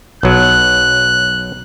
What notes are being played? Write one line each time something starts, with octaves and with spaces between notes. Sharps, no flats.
B1 F#3 F#6